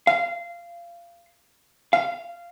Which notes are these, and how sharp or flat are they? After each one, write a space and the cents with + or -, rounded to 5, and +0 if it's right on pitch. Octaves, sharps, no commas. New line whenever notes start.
F5 -20
F5 -15